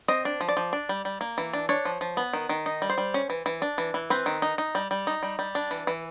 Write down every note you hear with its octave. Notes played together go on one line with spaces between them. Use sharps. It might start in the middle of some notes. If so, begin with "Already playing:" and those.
C4 D#5
D4
F3
D5
F3
D4
G3
G3
A#3
E3
D4
D4 C#5
F3
F3
B3
D#3
D#3
D#4
G3
C5
G3
C#4
E3
E3
D4
E3
E3
C4 B4
D#3
D#4
D#4
G3
G3
D#4
G3
G3
D4
E3
E3